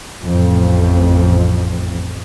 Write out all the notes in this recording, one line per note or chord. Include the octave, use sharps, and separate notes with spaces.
A1 F2